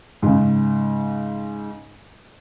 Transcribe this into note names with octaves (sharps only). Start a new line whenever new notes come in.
G#2 C#3